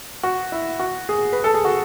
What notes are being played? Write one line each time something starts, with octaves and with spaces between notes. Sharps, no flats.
F#4
E4
F#4
G#4
B4
A4
G#4
F#4